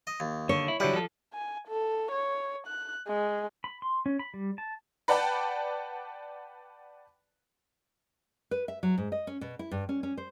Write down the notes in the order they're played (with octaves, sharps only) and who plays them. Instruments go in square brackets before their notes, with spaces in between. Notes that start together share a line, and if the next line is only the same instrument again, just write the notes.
[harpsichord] D#5
D#2
[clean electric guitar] D3 [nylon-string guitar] C#5
[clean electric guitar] E4
[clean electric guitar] D3 E4 [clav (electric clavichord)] F#3 G3 [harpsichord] B4
[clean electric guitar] F3 A4
[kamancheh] G#5
A4
C#5
F#6
G#3
[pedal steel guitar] B5
C6
C#4
B5
G3
A5
[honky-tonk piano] B4 D5 F#5 G5 A5 B5
[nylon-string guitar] B4
E5
F#3
G#2
D#5
C#4
B2
E4
G2
C#4
C#4
C5